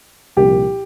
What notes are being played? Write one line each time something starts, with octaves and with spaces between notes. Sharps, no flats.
C2 A#2 F3 G4